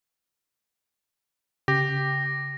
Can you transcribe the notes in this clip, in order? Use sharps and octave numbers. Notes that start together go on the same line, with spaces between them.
C#3 G4 A#6